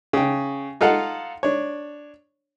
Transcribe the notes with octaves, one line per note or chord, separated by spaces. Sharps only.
C#3 G5
D#4 F4 A4 F5 F#5
D4 C#5